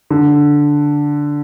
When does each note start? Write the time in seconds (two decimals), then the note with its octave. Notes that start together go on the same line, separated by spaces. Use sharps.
0.10 D3